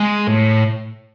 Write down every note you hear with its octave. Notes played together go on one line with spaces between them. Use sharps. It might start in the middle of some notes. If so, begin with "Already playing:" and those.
Already playing: G#3
A2